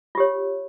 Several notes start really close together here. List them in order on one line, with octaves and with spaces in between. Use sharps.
F4 G4 C#5